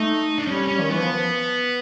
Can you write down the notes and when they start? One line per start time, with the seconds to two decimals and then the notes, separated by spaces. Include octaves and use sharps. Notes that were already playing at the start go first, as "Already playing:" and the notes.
Already playing: A3 D#4
0.39 D4
0.47 G3 C#4
0.67 C#4
0.81 D#3
0.89 E3 B3
1.01 F3